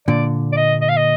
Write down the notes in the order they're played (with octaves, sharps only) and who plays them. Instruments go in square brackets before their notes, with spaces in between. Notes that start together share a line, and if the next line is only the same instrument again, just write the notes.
[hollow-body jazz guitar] A#2 D3 [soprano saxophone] D5
[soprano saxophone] D5
D#5
D#5
F5
D#5